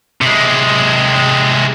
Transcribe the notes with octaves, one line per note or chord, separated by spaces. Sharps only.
C3 G#3